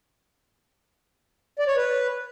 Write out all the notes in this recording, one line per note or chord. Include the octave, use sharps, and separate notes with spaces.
D5
C#5
B4